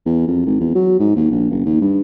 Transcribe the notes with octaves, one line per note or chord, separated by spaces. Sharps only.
E2
F2
G#1
E2
F#3
G#2
D#2
A#1
F#1
D#2
G2